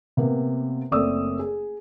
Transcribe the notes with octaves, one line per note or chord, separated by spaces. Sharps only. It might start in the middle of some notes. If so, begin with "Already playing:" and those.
C3 A#3 B3
F#1 A3 C4 D5 D#6 E6
G#4